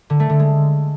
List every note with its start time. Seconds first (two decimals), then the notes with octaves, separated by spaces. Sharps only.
0.10 D3
0.20 A3
0.30 D3
0.39 G#3